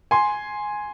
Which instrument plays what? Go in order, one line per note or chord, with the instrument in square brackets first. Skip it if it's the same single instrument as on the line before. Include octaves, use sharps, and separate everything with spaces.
[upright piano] G#5 C6